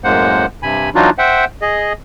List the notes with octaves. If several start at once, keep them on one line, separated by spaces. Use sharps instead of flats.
F#2 A2 G#3 A#3 C5 F#5
G2 C3 G#5 B5
E3 F#3 D4 D#4 F4 F#4
C5 E5 F#5 G5
G#4 D#5